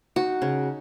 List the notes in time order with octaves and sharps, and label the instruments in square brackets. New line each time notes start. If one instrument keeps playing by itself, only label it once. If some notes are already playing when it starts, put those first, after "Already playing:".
[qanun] D#4 F#4
C#3